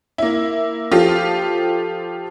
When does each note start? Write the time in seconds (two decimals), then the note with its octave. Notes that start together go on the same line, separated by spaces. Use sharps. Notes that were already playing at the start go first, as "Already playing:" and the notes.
0.18 A#3 E4
0.91 F3 F4 G4 A4